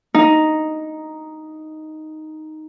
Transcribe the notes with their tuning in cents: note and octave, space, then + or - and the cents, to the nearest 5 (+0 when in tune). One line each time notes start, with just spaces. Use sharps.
D#4 +0